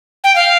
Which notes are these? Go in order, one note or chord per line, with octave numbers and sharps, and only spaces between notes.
G5
F5